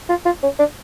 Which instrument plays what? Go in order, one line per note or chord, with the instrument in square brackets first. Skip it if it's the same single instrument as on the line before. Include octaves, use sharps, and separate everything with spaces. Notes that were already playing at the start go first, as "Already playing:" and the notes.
[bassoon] F4
F4
C#4
D4